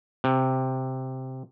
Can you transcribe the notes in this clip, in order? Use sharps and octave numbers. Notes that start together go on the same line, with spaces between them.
C3